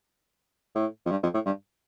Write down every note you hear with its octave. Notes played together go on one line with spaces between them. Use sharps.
A2
F2
G2
F2
A2
G2